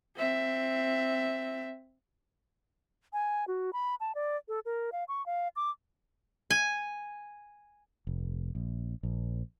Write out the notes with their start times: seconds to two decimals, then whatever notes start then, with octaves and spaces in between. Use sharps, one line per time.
0.16 C4 E5
3.13 G#5
3.48 F#4
3.73 B5
4.00 A5
4.15 D5
4.48 A4
4.66 A#4
4.92 F5
5.08 C#6
5.26 F5
5.56 D6
6.50 G#5
8.07 F1
8.55 A#1
9.03 A#1